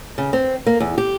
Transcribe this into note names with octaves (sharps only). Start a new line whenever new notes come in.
C#3
C4
A#3
E2
G4